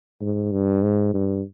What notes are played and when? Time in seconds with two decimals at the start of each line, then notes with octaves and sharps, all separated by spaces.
0.21 G#2
0.52 G2
0.83 G#2
1.14 G2